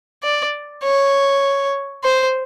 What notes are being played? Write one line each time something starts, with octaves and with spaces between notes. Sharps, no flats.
D5
C#5
C5